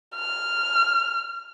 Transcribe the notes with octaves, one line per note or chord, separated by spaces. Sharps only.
F6